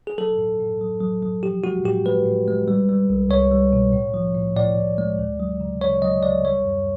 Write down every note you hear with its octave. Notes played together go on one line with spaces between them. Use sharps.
G#4
F#3 A4
A2
A2
F#3
F#3
F#3
F3 G4
G#3 F#4
A2 G4
G#3 B4
A2
G#3
G3
G3
C2
C2 C#5
G3
B2
A2
F3
A2
A2 D5
A2
G#3
D2
F#3
C#3
C#3 C#5
F#3 D#5
D2 D5
G3 C#5
F#2